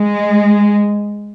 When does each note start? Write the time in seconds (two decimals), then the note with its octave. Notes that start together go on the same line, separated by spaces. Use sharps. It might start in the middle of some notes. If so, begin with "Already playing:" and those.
Already playing: G#3